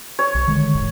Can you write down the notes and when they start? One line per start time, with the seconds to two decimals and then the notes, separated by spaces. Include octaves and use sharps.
0.19 C#5
0.35 B1
0.47 D3 D#3 G#3
0.75 F1 G#2 D#3